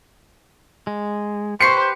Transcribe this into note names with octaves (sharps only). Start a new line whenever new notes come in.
G#3
G4 B4 C5 C#6 C7 C#7